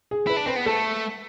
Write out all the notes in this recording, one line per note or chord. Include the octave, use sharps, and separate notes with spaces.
G#4
E4 B4
D4
C4 B4
B3
A3 A4